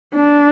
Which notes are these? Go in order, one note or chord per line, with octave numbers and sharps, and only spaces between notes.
D4